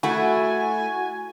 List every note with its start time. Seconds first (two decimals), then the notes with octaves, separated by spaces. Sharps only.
0.03 A3 E4 F#4 G#5